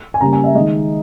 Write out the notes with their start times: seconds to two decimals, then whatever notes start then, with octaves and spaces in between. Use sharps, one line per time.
0.14 G#5
0.21 C#3 G3 A#3 A#5
0.33 G#5
0.44 E5
0.55 D#3 G#3 D#5